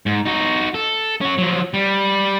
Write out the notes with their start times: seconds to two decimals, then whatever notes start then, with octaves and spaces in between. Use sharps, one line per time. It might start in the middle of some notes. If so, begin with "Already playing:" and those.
0.06 G#2
0.25 D#4 F#4
0.74 A4
1.21 C#4 F#4
1.38 F3 F#3
1.74 G3